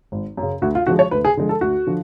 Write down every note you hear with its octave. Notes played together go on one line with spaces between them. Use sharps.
G#1
F#2 C#3
D2 F#4
F4
D3 F3 G#3 F#4
C#5
D2 B4
G#4
D3 F3 G#3
A4
D2 F#4
D3 F3